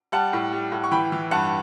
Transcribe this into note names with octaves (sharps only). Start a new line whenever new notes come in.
G3 F#5 A5
A2
G3
A2
C#6
E3 G5 B5
E3
G2 F#5 A5